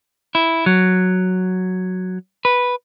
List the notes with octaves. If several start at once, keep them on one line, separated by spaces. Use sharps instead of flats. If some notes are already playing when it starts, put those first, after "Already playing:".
E4
F#3
B4